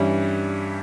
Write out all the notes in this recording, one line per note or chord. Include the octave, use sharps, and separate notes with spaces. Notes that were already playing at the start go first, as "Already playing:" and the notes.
Already playing: G2 E3 G3 C#4